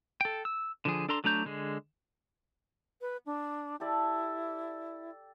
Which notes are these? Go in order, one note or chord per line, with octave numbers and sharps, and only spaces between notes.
A4 G5
E6
D3 F3 G#4
D4 A4 A#5 C6
F#3 A3 D4 A#5 G6
D3 G#3 G#4
B4
D4
E4 G4 A4 D5